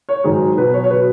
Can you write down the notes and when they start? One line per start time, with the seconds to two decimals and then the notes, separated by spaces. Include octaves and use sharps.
0.09 C#5
0.24 G#2 D#3 F#3 G#4
0.57 B2 F#3 B4
0.74 C#5
0.84 C#5
0.90 B2 F#3 B4